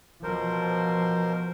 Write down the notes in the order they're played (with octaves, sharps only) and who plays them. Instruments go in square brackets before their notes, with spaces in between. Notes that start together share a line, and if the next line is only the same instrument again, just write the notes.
[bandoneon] B2 A#4 C5 [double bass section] F3